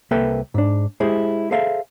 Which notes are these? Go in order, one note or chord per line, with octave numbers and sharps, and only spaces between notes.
C2 A#3 A4 B4 E5 G5
G#2 D4
G#3 E4 G4 G#4 C5
G#4 A4 C5 E5 F5